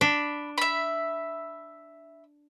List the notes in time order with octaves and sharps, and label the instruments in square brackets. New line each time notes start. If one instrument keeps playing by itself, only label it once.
[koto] D4 [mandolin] B5
[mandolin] E5 B5